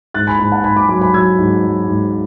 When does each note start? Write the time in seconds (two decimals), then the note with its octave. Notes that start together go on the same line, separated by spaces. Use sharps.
0.14 G#2 F#6 A6
0.27 G#5 B5
0.39 G#2 G#5 B5
0.52 F#5 A5
0.64 G#2 G#5 B5
0.76 B5 D6
0.89 F#3 B5 D6
1.01 G#5 B5
1.14 F#3 E6 G#6
1.39 G#2
1.64 F#3
1.88 G#2